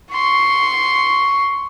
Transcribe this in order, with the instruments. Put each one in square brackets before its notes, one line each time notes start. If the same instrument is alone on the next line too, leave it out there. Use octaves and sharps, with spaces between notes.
[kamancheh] C6 C#6